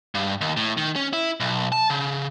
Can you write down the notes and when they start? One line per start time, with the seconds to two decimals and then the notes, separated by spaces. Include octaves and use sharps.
0.15 G2
0.41 D#2
0.57 A2
0.78 D#3
0.96 C#4
1.13 E4
1.40 B1
1.72 A5
1.90 C#3